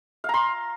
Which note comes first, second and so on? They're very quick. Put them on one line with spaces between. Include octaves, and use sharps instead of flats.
F5 A#5 C6